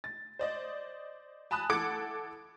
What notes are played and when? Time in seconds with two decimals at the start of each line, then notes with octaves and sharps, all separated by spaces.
0.04 A6
0.39 C5 D5 D#5
1.51 G#5 A5 B5 D#6 F#6
1.70 E3 A4 F#5 D6 G#6 C#7